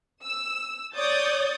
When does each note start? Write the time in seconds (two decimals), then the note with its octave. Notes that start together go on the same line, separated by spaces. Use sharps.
0.24 E6
0.96 C#5 D5 D#6 G6 A6